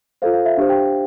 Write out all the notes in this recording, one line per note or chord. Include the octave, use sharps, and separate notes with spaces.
F4 A4 C5 F5
F5
E5
D4 G4 C5 F5
G4 G5